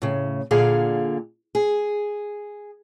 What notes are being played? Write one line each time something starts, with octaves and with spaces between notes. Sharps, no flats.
A2 C#3
A#2 D3 G#4 F5
G#4